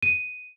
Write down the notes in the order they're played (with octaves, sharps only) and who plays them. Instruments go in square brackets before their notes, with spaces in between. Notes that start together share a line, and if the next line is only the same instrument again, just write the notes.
[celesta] D#7